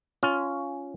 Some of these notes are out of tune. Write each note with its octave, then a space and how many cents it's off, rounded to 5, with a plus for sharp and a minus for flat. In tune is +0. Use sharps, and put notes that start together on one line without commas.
C#4 +10 F4 +0